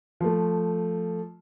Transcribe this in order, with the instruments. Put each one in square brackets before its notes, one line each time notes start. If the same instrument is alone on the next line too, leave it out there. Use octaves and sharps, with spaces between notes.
[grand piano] F3 A3